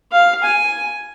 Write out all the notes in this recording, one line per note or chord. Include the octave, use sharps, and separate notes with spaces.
F5
G#5